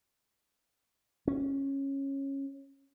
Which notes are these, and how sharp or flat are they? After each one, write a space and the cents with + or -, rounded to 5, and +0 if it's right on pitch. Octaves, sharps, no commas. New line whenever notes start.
C#4 -15